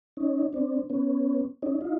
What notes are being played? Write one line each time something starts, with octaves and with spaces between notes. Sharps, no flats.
C#4 D#4
C4 D4
B3 C#4
C#4 D#4
D#4 F4